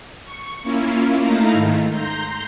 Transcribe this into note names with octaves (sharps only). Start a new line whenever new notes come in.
C#6
A#3 C#4 E4 F4
A3 D#4 E4 F5 A#5
G#2 D#3 A3
A#5 C6 G6